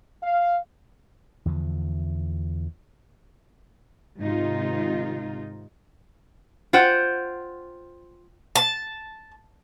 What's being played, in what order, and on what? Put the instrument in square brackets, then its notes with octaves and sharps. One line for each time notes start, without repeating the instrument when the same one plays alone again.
[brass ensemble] F5
[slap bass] E2 D3 F3
[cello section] G#2 C3 D#3 D#4 F4
[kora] F4 C5 F#5 G5
[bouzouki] A5